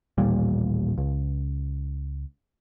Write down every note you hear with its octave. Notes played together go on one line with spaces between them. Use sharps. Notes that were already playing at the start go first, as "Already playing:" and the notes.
A1 D#2 A#2 G3
C#2